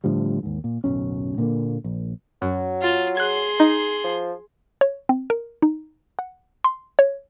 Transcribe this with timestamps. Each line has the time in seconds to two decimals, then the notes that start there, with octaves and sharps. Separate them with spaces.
0.04 A2 D3 F3 G3
0.43 D#2 G#2
0.64 A#2
0.84 D1 B1 F#2 C#4
1.38 A#2 D3 A#3
1.84 A#1
2.42 F#2 F#3
2.82 F4
3.17 G#4 C6 F#6 G#6
3.60 D#4
4.04 F3
4.81 C#5
5.09 C4
5.30 A#4
5.62 D#4
6.19 F#5
6.64 C6
6.99 C#5